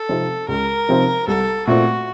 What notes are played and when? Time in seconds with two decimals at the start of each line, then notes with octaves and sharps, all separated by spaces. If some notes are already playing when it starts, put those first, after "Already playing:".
Already playing: A4
0.09 C3 F3 C4 D#4
0.48 C#2 A#4
0.89 C3 F3 C4 D#4
1.28 C2 A4
1.67 A#2 A3 C4 F#4